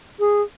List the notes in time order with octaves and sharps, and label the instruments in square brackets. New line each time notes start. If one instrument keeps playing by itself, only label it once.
[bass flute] G#4